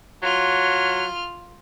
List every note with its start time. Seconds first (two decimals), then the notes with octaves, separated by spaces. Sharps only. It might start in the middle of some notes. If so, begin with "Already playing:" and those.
0.23 F#3 F4 F6